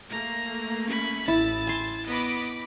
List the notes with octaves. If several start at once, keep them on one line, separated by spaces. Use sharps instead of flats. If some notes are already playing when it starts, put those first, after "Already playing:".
A3 A#3 A#5
C#4 B5
A1 E4 A5
G#5 C6
B3 D#5 B5 D6